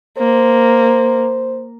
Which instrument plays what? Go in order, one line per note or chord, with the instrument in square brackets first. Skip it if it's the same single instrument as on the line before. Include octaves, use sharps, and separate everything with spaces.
[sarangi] A#3 [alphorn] C5